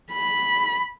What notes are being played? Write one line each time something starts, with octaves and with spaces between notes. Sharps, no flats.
B5